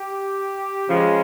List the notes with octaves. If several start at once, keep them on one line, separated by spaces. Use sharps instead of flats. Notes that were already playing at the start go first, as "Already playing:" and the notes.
Already playing: G4
C#3 F3 G#3